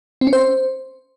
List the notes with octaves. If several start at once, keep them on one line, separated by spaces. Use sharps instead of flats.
C4
C#4
C5